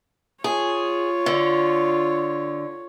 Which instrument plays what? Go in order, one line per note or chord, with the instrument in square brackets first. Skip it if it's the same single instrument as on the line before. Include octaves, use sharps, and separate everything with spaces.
[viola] F4 C#5 [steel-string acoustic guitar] G#4
[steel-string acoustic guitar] D3